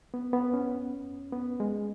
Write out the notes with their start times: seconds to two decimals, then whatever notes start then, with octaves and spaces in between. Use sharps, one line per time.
0.14 B3
0.33 B3
0.54 C#4
1.32 B3
1.60 G#3